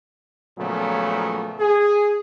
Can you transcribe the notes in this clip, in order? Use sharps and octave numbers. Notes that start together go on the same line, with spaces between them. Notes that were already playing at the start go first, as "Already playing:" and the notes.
A#2 C#3 F3 F#3 A3 B3
G#4